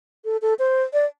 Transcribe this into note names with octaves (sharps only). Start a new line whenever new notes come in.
A4
A4
C5
D5